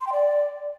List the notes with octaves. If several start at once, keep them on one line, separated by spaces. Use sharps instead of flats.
C6
G5
D5